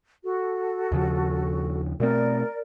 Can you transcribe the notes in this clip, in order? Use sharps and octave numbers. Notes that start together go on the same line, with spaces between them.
F#4 A4
D#2 C#3 F3
B2 A3 C4 A#4 D5